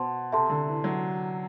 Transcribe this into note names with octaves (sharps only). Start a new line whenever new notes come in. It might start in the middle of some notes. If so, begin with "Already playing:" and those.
Already playing: B2 C5 F#5 A5 C6
C3 A4 E5 A5 C6
D3
E3
F#3